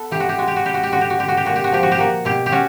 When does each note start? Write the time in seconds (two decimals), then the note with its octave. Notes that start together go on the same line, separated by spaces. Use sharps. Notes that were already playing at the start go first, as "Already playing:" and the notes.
Already playing: B3 A4
0.11 E3 G4
0.20 F#4
0.29 G4
0.38 G#3 F#4
0.48 G4
0.56 F#4
0.65 G3 G4
0.74 F#4
0.83 G4
0.91 D3 F#4
1.01 G4
1.10 F#4
1.19 D3 G4
1.28 F#4
1.37 G4
1.45 A#2 F#4
1.56 G4
1.64 F#4
1.72 F3 G4
1.83 F#4
1.91 G4
1.99 A#3 F#4
2.25 B2 G4
2.46 G4
2.52 C#4 F#4